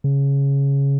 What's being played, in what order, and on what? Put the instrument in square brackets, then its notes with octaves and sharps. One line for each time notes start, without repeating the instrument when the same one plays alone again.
[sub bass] C#3